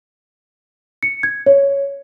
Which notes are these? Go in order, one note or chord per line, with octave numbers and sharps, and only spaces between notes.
C#7
G#6
C#5